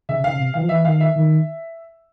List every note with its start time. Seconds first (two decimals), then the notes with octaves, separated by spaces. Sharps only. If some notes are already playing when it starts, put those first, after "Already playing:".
0.09 C#3 E5
0.24 C#3 F5
0.39 C3
0.54 E3 F5
0.61 F3
0.69 E3 E5
0.85 D#3 F5
1.00 E5
1.16 D#3